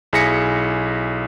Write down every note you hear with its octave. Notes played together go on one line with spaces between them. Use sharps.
B1 E4 G#4 A#6 B6 C#7